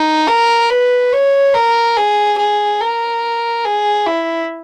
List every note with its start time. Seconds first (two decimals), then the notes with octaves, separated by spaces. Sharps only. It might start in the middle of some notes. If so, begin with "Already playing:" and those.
Already playing: D#4
0.28 A#4
0.70 B4
1.13 C#5
1.54 A#4
1.97 G#4
2.38 G#4
2.81 A#4
3.65 G#4
4.07 E4